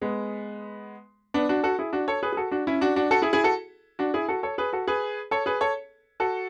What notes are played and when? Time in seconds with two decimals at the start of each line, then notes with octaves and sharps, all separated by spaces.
0.02 G#3 B3
1.34 B3 D4
1.49 D4 F#4
1.63 F#4 A4
1.79 E4 G#4
1.93 D4 F#4
2.08 A4 C#5
2.23 G#4 B4
2.33 G#4
2.37 F#4 A4
2.51 D4 F#4
2.67 C#4 E4
2.81 D4 F#4
2.96 D4 F#4
3.11 F#4 A4
3.22 E4 G#4
3.33 E4 G#4
3.44 F#4 A4
3.99 D4 F#4
4.14 E4 G#4
4.28 F#4 A4
4.43 A4 C#5
4.58 G#4 B4
4.73 F#4 A4
4.88 G#4 B4
5.31 A4 C#5
5.46 G#4 B4
5.61 A4 C#5
6.20 F#4 A4